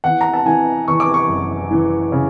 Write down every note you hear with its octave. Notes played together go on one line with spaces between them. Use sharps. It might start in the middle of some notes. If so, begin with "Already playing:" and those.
E2 F#5
A#5
A5
E3 G#5
E2 C#6
D6
C#6
F#1
E3
C#3